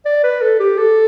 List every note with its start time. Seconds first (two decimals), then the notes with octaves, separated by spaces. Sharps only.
0.05 D5
0.23 B4
0.42 A4
0.59 G4
0.78 A4